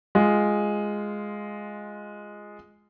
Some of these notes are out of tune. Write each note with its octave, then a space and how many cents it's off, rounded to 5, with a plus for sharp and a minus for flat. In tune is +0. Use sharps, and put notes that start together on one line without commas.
G#3 +0 F4 +0